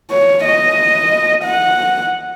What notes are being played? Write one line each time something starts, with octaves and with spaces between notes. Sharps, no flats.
C#5
D#5
F#5